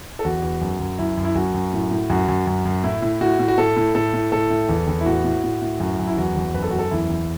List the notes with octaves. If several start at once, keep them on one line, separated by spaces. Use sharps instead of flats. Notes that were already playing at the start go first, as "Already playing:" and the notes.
A4
E2 F#4
E2
F#2
F#2
F#2 E4
F#2
E4
F#2 F#4
F#2
A2
A2
F#2 F#4
F#2
F#2
F#2
A2 E4
A2
A2 F#4
A2
F#4
A2 A4
A2
A2 A4
A2
A2 A4
A2
E2
E2
E4
A2 F#4
A2
A2
A2
F#2 F#4
F#2
E4
E2 F#4
E2
F#2 B4
A4
F#2 F#4
A4
E2 E4
E2